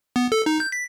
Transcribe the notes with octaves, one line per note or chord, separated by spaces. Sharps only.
B3
A4
D#4
G6
B6